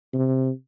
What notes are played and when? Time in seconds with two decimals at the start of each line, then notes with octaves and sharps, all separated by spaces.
0.13 C3